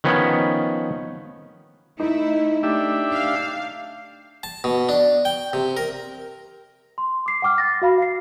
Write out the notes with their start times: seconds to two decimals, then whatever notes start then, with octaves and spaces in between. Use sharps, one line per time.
0.04 D#3 F3 B3 C#4
2.00 A3 D#4 E4
2.63 A3 D4 G4 E5
3.12 F5
4.43 A5
4.64 B2
4.89 D4
5.25 G5
5.53 C3
5.77 A#4
6.98 C6
7.26 D6 C7
7.42 F#5 G5 D6 F6
7.58 A6 A#6
7.82 F#4 F5 B5
7.98 F5 C7